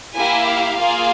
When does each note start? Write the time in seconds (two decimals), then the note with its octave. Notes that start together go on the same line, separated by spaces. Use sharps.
0.14 A#3 E4 G4 G#5
0.46 F5
0.78 A#3 F4 G#4